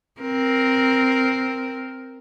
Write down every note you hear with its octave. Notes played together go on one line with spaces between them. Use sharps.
C4 A#4